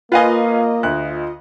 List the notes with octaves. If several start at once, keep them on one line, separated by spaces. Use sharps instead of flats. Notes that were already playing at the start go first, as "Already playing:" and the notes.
A#3 F4 B4 D#5 F5 G#5
D2 F#6